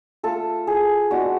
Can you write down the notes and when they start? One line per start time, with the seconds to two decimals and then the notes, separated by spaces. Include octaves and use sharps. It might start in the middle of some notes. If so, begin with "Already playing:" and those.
0.23 A3 F4 A4
0.67 G#4
1.11 G#3 B3 D4 F#4